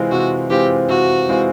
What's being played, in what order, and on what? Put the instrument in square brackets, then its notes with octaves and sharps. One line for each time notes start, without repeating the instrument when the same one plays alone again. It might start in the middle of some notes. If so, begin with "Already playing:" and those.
Already playing: [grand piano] C3 E3 G#3 C4 F4
[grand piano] C3 [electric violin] F#4
[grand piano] E3 G#3 C4 F4 [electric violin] G4
[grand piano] C3 [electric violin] F#4
[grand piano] E3 G#3 C4 F4